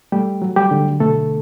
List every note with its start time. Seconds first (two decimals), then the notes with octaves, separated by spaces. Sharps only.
0.12 G3 A3 G4
0.42 F#3
0.56 G3 G4
0.71 D3
1.00 B2 A3 A4